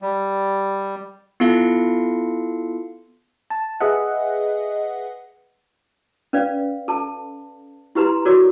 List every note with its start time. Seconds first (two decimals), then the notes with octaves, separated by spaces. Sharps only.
0.02 G3
1.40 B3 E4 F4 A4 F5 C#7
3.50 A5
3.80 G#4 B4 D#5 E5 F#5
6.33 C#4 B4 D5 F5
6.88 A4 A5
7.95 E4 G4 B4 A#5 C6
8.25 F#4 A4 A#4 C#5 D5